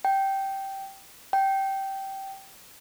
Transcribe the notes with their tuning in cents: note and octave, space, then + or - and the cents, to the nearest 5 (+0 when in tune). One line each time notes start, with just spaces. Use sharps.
G5 -10
G5 -15